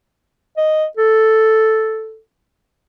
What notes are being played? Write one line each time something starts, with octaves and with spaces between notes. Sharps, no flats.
D#5
A4